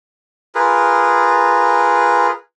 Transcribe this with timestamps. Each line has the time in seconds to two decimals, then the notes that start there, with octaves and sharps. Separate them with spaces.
0.55 F4 G#4 A#4 B4